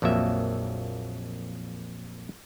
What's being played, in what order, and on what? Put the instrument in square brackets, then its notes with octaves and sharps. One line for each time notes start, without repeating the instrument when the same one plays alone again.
[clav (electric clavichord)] A#1 F2 F#3 A#3 E5